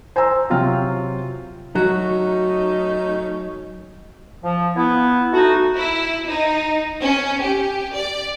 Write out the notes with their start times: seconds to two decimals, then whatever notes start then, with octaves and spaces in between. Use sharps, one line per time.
0.16 C5 G#5 A#5 C6 E6
0.50 C3 F#3 F4 G5 F6
1.75 F#3 A3 C#4 D#4 F#4
4.44 F3
4.76 B3 E4
5.33 A3 D#4 F#4
5.76 E4
6.26 D#4
7.03 C#4
7.42 G4
7.95 D5